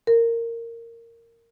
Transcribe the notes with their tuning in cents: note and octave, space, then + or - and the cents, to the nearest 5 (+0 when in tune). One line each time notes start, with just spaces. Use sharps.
A#4 -15